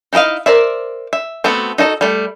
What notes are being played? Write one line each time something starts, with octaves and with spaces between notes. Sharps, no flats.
D#4 E4 A4 D#5 F5
A#4 C5 D5 E5
E5
A3 B3 C4 F#4 A4
D#4 F#4 A4 D#5
G3 A3